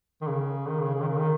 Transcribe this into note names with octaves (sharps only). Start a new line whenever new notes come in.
D#3
C#3
D#3
C#3
C#3
D#3
C#3
D#3